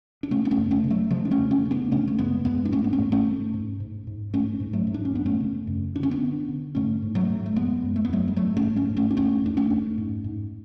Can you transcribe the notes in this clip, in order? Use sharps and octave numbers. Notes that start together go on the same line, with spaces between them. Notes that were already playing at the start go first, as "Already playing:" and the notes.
D4
C#3 A3 C#4
B3
A3 C#4
F#2
A3 C#4
C#3
F#3 A3
C#3 F3 G#3
D4
A3 C#4
F2
A3 C#4
C#3
B3 D4
C#3 A3 C#4
A3
F#2 G#3 B3
F#2 G#3 B3
D4
G#2 A3 C#4
B3
A3 C#4
G#2
A3 C#4
G#2
G#2
G#2
G#2
G#2 A3 C#4
G#2
F#3 A3
G#2
D4
C#4
F#2 B3
A3 C#4
C#3
F#2
D3 D4
C#4
B3 D4
D3
D3
G#2 A3 C#4
G#2
F#3 A3
G#2
A3
F#2 G#3 B3
F#2
A3
B3
F#2 F#3 A3
G#3
G#2 F#3 A3
A3 C#4
G#2
A3 C#4
G#2
A3 C#4
D4
F2 A3 C#4
F2 D4
A3 C#4
F2
G#2
G#2